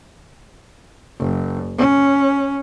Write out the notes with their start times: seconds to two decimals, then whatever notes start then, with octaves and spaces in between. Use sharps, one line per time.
1.19 F#1
1.78 C#4